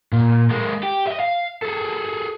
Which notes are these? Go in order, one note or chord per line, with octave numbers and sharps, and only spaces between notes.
A#2
G#3 A#3
G4
D#5 E5
F5
G#4 A4